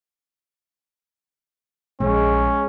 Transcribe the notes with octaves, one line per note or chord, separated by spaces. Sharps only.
A#1 G#3 C#4